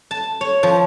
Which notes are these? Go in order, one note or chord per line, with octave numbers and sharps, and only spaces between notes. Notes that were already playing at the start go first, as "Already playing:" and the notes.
A5
C#5
F3